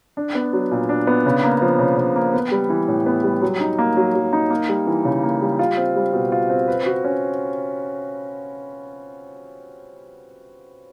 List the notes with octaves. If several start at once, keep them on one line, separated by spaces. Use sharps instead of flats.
D4
B3
F#3
A#2
D4
B3
C#3
A#3
F3
C#3
C#3
A#3
B3
G3
E3
A2
B3
G3
F#3
D#4
A#3
F#3
F#3
D#4
A#3
G3
E3
C#3
A#3
G3
F4
C4
G3
B2
F4
C4
B4
F#4
C#4